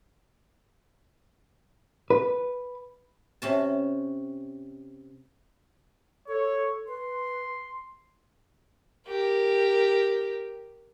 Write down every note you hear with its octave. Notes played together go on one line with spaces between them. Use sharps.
B4
C3 C#4 A5
A4 C#5
B4 C6
G4 A#4